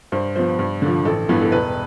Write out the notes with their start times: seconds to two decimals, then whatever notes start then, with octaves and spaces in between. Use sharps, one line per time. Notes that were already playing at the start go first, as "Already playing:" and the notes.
0.12 G2 C5
0.36 F3 B3 C5
0.59 G2
0.82 D3 F3
1.05 A1 A4
1.29 G2 E3 B3
1.41 A4
1.52 E1 B4